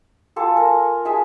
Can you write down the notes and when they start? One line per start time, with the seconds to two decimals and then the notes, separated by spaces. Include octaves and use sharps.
0.36 F4 A4 G#5 D6
0.57 A#4
1.05 G#4 E5 G#5 A5